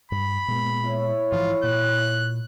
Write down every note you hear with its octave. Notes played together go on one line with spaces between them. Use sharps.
G2 B5
A#2 G#3 B3
E4 C#5
G#2 E3 F3 F4
A#2 F#6